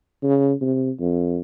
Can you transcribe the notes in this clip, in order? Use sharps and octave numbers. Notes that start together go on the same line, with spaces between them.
C#3
C3
F2